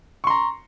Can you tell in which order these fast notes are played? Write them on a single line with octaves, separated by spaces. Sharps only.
C#6 C6 A#5